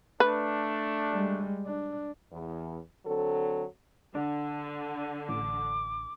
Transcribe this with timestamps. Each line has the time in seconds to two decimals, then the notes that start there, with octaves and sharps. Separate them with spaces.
0.20 A3 D4 B4
1.10 G3 G#3
1.66 D4
2.32 E2
3.06 D3 F#3 C4 A4
4.15 D3 D4
5.29 A1 D6